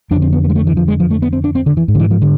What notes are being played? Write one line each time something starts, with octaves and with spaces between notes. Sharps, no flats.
F2 D4
D3
C4
B3
B3
G#3
A3
E3
F3
G#3
F3
A3
B3
C4
D4
C4
D3
E3
G#2
D3
E3
F3
D3